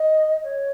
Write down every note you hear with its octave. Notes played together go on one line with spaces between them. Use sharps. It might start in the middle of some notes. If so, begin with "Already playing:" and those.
Already playing: D#5
C#5